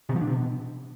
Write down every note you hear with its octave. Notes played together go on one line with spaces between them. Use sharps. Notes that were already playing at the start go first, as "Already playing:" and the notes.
B2
E3
D4
B2